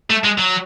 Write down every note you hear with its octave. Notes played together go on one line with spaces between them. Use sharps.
A3
G#3
F#3